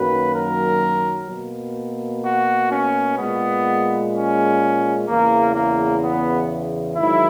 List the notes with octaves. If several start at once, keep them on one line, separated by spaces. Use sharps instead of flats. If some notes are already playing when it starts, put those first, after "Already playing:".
Already playing: F#2 D#3 F#3 A#3 B4
A#4
B2 A#3
F#4
C#4
A#2 G#3 B3
C#4
E2 C#3 E3 A#3
A#3
B3
G#2 D#3 F#3 E4